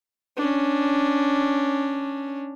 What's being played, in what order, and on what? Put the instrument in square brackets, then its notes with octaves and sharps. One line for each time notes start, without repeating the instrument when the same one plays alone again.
[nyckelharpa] C#4 D4